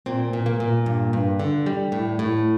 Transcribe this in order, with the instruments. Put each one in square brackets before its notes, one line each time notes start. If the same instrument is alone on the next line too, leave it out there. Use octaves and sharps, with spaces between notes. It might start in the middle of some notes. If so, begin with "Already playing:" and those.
[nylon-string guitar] A#2 C4
A#2
A#3
A#2
G2
G2
D3
G3
A2
A2